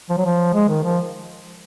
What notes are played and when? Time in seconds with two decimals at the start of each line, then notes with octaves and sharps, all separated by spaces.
0.09 F3
0.17 F#3
0.25 F3
0.54 G#3
0.69 D#3
0.83 F3